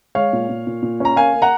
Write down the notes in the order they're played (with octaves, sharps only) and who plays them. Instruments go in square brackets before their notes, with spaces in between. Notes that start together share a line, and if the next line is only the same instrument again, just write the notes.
[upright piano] G#3 C#5 F5
A#2
A#2
A#2
A#2
C#4 A#5
A#3 F5 G#5
A#3
F#5 A#5